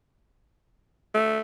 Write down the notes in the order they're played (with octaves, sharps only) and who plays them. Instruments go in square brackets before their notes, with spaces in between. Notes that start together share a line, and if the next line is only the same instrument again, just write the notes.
[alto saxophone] A3